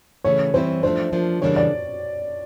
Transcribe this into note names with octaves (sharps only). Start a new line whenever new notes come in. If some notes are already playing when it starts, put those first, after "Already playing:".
C#3 E3 A3 C#4 C#5
E3 G3 C4 E4 C5
F3 A3 D4 C5
F3 A#3 D4
C#3 E3 G3 A#3 D4 C#5
D5